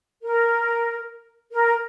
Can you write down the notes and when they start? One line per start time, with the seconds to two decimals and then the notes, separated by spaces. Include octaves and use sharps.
0.22 A#4
1.52 A#4